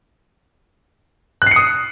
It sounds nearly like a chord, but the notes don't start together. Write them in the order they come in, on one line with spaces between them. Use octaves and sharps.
F#6 C7 C#7 D#6